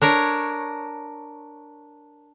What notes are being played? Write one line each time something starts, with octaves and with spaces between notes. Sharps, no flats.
D4 A#4 C#5